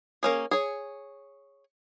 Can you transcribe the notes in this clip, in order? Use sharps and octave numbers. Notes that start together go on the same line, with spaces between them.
A#3 C#4 G#4
G#4 C#5